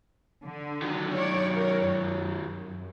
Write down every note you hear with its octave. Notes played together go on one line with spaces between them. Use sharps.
D3
D#3 F#3
C#5 D5
A#4 C#5
F#2